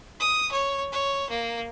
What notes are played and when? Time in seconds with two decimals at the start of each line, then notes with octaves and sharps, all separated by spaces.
0.20 D#6
0.51 C#5
0.92 C#5
1.30 A#3